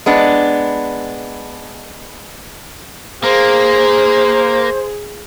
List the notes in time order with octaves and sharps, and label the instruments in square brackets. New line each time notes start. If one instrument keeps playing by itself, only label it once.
[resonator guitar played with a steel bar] G#3 B3 D4
[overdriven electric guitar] A#3 [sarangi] G#4 [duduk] C5